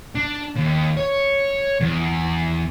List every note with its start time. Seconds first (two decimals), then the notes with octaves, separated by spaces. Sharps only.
0.15 D4
0.56 D#2
0.97 C#5
1.80 E2